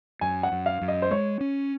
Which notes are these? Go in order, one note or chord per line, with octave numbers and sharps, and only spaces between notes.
F#2 G#5
F#5
F#2
F5
F#2
D#5
C5
G#3 C#5
C#4